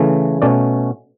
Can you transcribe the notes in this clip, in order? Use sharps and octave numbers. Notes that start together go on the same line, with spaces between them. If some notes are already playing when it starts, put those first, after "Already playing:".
Already playing: C#3 E3 A3
B2 A3 C#4 D5